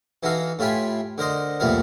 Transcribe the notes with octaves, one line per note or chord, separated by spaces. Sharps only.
E3 D#4 F#4 A4 F5
A2 A3 F4 G4 G#5 B5
D3 A#4 C5 D#5
C2 F2 A#2 A3 B3 A#4